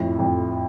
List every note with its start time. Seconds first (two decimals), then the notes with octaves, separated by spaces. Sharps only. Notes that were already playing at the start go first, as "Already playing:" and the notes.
Already playing: F2 A2
0.19 F2